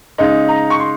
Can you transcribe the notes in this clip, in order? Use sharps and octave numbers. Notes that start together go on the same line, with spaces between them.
C#3 G#3 D#4
A#5
C#6
C6